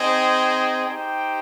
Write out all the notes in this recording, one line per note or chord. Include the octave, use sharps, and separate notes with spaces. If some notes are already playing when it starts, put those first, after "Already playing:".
Already playing: C4 D#4 G#4 C5 D#5
D#4 G4 C5 G5